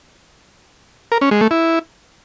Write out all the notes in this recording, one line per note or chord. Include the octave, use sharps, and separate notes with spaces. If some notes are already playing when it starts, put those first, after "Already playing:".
A#4
C#4
G#3
A3
E4